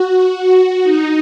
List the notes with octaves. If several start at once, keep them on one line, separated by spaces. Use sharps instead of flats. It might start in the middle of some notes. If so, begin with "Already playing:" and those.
Already playing: F#4
D#4